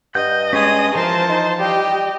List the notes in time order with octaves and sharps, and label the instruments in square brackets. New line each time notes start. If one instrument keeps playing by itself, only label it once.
[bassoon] G2 [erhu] D#5 [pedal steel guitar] F#5 G6
[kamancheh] G#3 D#6 [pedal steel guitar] C#4 G#5
[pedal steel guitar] E3 F3 [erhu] A#4 [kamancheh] C5 A5
[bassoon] D#4
[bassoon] G3 [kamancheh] G4 [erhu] D#5